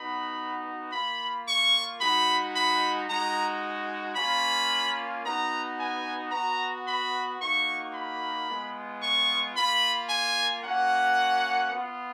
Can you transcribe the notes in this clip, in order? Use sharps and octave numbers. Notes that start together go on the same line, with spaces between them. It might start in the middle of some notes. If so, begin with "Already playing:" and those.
Already playing: B3 D#4 F#4 B5
A#3 F4 B5
C#6
G#3 D#4 F#4 B5
B5
G#3 D#4 F#4 A#5
A#3 C#4 F4 B5
B3 D#4 F#4 A#5
G#5
B3 F#4 A#5
B5
A#3 D#4 F#4 C#6
B5
G#3 B3 F4
C#6
A#3 F4 B5
G#5
A#3 C#4 F#4 F#5
B3 F4